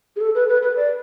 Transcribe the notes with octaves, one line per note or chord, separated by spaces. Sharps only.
G#4
A4
B4
B4
B4
D5